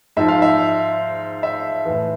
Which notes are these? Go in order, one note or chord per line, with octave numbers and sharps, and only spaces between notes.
G#2 F3 E5
F5
E5
E5
A2 E3